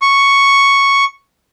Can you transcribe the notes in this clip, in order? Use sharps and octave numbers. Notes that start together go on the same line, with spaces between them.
C#6